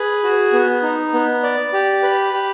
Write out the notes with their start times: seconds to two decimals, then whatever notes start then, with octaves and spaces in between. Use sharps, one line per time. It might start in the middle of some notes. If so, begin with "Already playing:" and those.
Already playing: G#4 B4
0.23 F#4
0.53 B3
0.83 D#4
1.14 B3
1.43 D5
1.73 G4
2.03 B4
2.33 G4